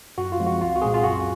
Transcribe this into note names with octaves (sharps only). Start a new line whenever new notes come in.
F#2 F#4
F4
F3 G#3 C4
F#4
C2 F4
F#4
A#2 G#3 C4 G#4
F4
F#2 F#4